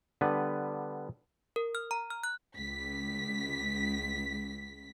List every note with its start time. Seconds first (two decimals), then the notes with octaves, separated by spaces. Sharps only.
0.21 D3 G3 B3 B4
1.56 A#4
1.75 F6
1.91 A#5
2.10 F6
2.23 F#6
2.57 C#2 B6